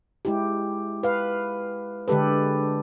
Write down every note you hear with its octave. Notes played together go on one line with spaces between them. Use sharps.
G#3 E4 G4
B4 F5
D3 G#3 G4 A4 B4